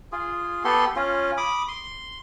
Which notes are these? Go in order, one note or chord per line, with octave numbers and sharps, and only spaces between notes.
F4 G#4
B3 G4 A4 C6
C#4 F4
B5 D6 D#6
C6